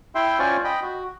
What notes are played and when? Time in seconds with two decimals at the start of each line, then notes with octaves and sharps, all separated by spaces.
0.15 E4 E5 G5 C6
0.39 C#4 F4 C5 D5 G#5 C#6
0.64 D#5 G5 B5
0.82 F#4